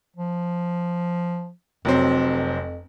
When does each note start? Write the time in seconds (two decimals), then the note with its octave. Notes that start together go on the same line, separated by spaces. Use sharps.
0.17 F3
1.85 F1 F2 F#3 C4